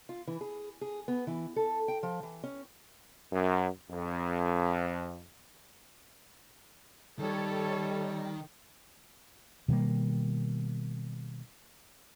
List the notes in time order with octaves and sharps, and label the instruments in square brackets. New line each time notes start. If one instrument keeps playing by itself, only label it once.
[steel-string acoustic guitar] F4
E3
G#4
G#4
B3
E3
A4
G5
F3
E3
C#4
[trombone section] F#2
F2
[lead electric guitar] D#3 [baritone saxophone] G3 [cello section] A4 C#5
[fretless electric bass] B2 D#3 G3 A#3